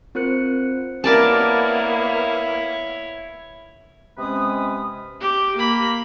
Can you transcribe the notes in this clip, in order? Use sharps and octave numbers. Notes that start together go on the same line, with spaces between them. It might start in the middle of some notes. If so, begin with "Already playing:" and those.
C4 F4 A#4 C5 F#6 C#7
A#3 B3 E4 A#4 C#5 D5 A5
C3 G#3 C#4 B4 D#6
G4
A#3 B5